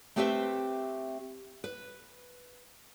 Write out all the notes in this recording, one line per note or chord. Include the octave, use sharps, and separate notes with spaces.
A3 C4 G4 B4 C5 E5
B4